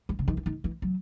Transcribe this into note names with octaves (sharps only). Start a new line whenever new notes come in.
G#3
C#3
D#3
E3
D#3
E3
F#3